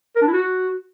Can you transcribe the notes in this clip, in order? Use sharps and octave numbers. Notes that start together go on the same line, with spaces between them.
A#4
D4
E4
F#4